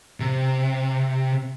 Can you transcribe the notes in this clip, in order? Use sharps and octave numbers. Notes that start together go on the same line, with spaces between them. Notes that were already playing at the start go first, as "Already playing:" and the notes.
C3